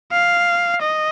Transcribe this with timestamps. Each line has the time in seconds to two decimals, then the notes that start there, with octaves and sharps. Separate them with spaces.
0.12 F5
0.81 D#5